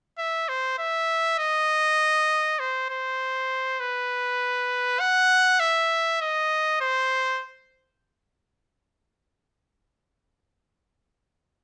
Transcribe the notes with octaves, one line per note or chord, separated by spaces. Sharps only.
E5
C5
E5
D#5
C5
C5
B4
F#5
E5
D#5
C5